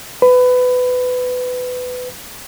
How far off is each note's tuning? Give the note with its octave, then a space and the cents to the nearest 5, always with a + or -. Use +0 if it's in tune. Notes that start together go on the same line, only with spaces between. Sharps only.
B4 +20